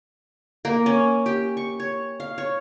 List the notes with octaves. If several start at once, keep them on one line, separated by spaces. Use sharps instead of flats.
A#3
C#4
G4
C#6
C#5
F5
C#5